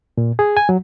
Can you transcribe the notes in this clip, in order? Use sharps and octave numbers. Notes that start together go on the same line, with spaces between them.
A#2
G#4
G#5
F#3